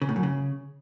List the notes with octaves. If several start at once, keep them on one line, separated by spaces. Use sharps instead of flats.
C#3
A2
F#2
C#3